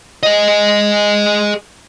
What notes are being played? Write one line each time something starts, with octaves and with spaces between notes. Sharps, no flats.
G#4 D#5